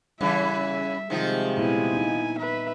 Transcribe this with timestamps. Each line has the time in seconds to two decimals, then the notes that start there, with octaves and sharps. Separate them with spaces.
0.21 C#3 E3 G3 E5
1.10 C3 D#3 F3 G#3 F4
1.57 A#2 B3 E4 B4 G#5
1.93 C4 D#4
2.38 B4 E5